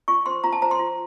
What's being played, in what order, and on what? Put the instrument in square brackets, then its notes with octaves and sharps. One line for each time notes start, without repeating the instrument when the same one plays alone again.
[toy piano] F4 C#6
C5 C6
F4 A#5
A5
C5 A#5
C6
F4